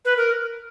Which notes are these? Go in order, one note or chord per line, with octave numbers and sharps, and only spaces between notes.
B4
A#4